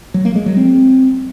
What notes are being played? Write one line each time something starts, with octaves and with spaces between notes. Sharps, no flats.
F#3
A#3
G#3
F#3
C4